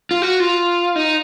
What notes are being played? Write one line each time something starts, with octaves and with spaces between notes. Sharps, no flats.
F4
F#4
F4
D#4